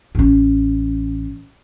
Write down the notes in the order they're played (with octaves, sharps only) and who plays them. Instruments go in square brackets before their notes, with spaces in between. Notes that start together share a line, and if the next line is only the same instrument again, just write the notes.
[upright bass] A1 C#4